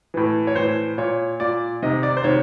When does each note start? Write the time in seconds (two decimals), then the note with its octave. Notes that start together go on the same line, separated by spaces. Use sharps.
0.14 A2 E3
0.47 C#5
0.56 A2 E3 C5
0.98 A#2 C#5
1.40 A#2 D5
1.82 C3 D#3 D#5
2.03 D5
2.17 C5
2.24 C3 D#3 C#5